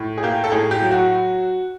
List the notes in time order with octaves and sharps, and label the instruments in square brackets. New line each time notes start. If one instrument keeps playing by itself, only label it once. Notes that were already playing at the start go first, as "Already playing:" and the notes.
Already playing: [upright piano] A2
G#4
A#3 G4
A4
A2 G#4
G4
F#3
F#4